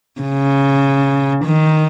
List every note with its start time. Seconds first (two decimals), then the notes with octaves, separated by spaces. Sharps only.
0.22 C#3
1.45 D#3